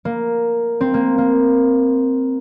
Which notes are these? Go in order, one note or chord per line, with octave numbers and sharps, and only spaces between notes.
A#3
C4
A#3
A#3